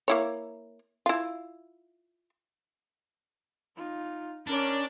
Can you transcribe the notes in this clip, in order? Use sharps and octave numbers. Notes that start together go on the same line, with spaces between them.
A#3 E4 C#5
E4 F4
D#4 F4
C#4 D4 A#4 D5